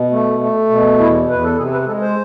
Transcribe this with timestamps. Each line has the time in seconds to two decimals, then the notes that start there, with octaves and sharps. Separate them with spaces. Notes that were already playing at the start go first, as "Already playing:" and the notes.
Already playing: B2
0.11 A3
0.40 A3
0.69 B2
0.99 E2 E4
1.28 E2 B4
1.44 A4
1.58 C3 G#4
1.73 B4
1.87 G#3 A4
2.02 C5